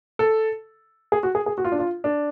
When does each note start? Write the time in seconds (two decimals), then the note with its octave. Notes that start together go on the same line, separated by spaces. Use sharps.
0.19 A4
1.12 G#4
1.23 F#4
1.35 G#4
1.46 G#4
1.58 F#4
1.64 F4
1.72 D4
1.79 F4
2.04 D4